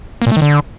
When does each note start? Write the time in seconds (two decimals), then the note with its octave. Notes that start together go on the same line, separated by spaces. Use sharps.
0.22 A#3
0.27 A#2
0.32 A3
0.37 D#3
0.42 D3